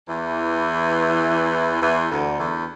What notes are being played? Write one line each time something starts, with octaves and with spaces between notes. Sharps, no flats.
E2 E3
E2 E3
D2 D3
E2 E3